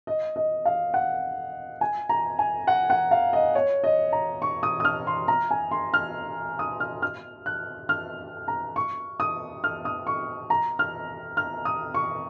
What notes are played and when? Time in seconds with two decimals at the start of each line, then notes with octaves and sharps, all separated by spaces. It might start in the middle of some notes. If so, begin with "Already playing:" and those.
0.07 D#5
0.36 D#5
0.65 F5
0.94 F#5
1.81 G#5
2.09 A#5
2.39 G#5
2.67 F#5
2.90 F#5
3.11 F5
3.33 D#5
3.55 C#5
3.84 D#5
4.13 A#5
4.42 C#6
4.63 D#6
4.80 D#6
4.85 F6
5.07 C6
5.28 A#5
5.51 G#5
5.71 C6
5.94 F6
6.59 D#6
6.80 F6
7.02 F6
7.46 F#6
7.89 F6
8.48 A#5
8.76 C#6
9.20 D#6
9.64 F6
9.85 D#6
10.07 C#6
10.50 A#5
10.79 F6
11.37 F6
11.65 D#6
11.94 C#6